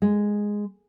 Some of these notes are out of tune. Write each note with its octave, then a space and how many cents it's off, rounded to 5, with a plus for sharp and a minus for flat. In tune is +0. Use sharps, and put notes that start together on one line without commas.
G#3 -5